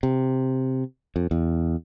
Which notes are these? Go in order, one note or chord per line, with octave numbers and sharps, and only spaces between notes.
C3
F2
E2